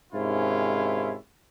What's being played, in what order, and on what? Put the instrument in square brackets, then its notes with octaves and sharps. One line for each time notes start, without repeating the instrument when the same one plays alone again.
[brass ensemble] G#2 C3 D#3 C#4 E4 F4